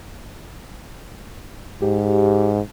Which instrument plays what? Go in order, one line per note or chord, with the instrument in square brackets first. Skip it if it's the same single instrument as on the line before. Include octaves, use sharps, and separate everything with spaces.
[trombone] G#2 [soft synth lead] G4